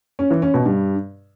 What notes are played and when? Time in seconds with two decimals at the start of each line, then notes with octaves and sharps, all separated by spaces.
0.19 C#4
0.31 E3
0.42 C#4
0.54 B2
0.66 G2